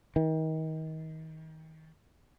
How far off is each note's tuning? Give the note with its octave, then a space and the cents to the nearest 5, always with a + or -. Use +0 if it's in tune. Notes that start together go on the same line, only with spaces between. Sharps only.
D#3 +30